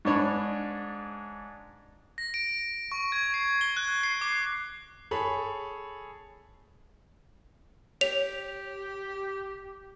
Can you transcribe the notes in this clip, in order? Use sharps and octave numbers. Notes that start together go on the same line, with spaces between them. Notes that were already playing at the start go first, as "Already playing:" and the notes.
G#2 G#3 D4 C#5 B5
A#6
D7
C#6
G#6
C7
G7
F#6
C7
D6
G#4 A4 C#5 B5
G4 C#5 F7